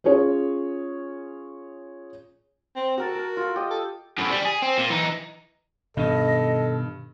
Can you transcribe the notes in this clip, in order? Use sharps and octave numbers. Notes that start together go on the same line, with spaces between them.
C#4 F4 G#4 C#5
C4
F#4 A4 A#4 A5
A#4
F4 A4
G4 D#5
A4
F#2 A2
G3
G#4
C4
A#2
E3 D#4
G2 B2 D#3 A4 D#5